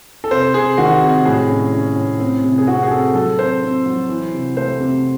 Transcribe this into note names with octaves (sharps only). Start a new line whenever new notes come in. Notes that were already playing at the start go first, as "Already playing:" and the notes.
A4
C3 C5
C3 G#4
D#3 F#4
C3
A2 G#4
C#4
C#4
A2
C4
C3
G#4
C4 F#4
G#4
C4 A4
F#3 A4
C4 C5
C4
F#3
E3
C3
A3 C5
C3